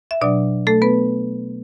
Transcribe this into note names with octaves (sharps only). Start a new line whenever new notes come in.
E5
B2 F#3 D4 D5
A3 A4
B3 B4